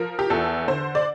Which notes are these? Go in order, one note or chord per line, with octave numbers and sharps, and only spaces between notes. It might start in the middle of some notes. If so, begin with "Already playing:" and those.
Already playing: F3 A#4
G4
E2 A4
D3 C5
D5